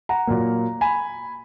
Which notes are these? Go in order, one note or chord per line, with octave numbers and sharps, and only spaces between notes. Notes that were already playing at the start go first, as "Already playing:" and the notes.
F#5 A#5
A#2 F#3 A#3
G#5 B5